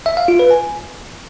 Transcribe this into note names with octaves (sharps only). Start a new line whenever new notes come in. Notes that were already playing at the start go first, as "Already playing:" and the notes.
E5
F5
F4
B4
G#5